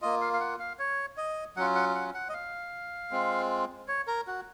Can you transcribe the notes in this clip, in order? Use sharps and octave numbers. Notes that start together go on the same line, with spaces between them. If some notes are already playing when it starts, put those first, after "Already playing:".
A#3 F4 D#5
F5
F5
F#5
F5
C#5
D#5
F#3 C#4 F4 F#5
F#5
F#5
F#5
D#5
F5
G#3 C4 F4
C#5
A#4
F#4